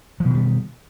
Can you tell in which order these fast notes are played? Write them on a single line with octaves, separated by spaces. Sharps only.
F3 B2 D#3 G3